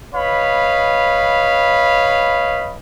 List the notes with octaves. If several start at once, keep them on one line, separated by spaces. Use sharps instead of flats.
B4 C#5 D#5 F5 B5